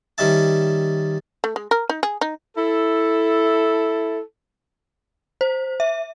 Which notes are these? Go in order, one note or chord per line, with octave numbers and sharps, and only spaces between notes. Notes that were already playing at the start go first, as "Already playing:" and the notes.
D#3 G3 C#4 E5 A5
A3
G#3
A#4
D#4
G#4
D#4
E4 A4
C5
E5